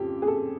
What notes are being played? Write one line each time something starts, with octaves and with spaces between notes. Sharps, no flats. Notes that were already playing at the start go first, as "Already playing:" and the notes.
Already playing: F2 C#3 G4
G#4
A4